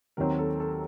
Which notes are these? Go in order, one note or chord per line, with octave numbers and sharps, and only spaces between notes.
D#2 D#3 F#3 C4 A#4
A4
A4